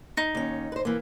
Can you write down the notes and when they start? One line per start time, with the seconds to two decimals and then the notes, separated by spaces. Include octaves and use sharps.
0.17 D#4
0.35 D#2 C#4
0.72 B4 C5
0.85 E3 A#3